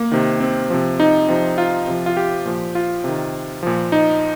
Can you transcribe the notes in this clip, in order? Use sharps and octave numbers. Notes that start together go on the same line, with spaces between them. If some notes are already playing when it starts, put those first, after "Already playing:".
Already playing: A#3
C3 D#3
C4
C3 F3
D#4
C3 F3
F4
C3 F3
F4
G4
A#2 F3
F4
C3 D#3
A#2 F3
D#4